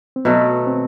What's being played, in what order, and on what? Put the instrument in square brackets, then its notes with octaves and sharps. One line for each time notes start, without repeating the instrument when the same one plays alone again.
[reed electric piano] C4
[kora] B2 F#3 A3 [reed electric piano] B3
[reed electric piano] C4